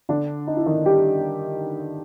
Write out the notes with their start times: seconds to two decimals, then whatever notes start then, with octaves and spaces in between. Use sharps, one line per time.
0.09 D3 D4
0.47 D#4
0.57 E4
0.66 D#3 D#4
0.86 G3 G4